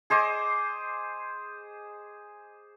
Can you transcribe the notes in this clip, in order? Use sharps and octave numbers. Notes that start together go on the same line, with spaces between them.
G#4 C5 D#5 D6